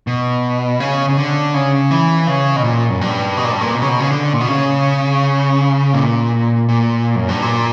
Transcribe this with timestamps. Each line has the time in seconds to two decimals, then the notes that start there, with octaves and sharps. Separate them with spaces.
0.07 B2
0.80 C#3
1.08 C#3
1.17 D3
1.54 C#3
1.91 E3
2.27 C#3
2.56 B2
2.63 A#2
2.90 F#2
3.01 G2
3.37 B2
3.45 A#2
3.53 G2
3.61 A#2
3.75 B2
3.82 C#3
3.89 B2
4.00 C#3
4.10 D3
4.33 A#2
4.41 B2
4.47 C#3
5.94 A#2
6.69 A#2
7.16 F#2
7.29 G2
7.42 A#2